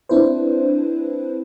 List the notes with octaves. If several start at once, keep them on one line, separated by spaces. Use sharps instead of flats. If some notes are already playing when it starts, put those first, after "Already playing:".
C4 D4 E4 B4 C5